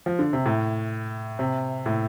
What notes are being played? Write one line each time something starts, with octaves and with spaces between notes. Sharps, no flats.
F3
D3
C3
A2
C3
A2